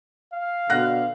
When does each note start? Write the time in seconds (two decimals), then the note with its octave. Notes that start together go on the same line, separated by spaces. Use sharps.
0.33 F5
0.70 B2 D3 F#5 F#6 A#6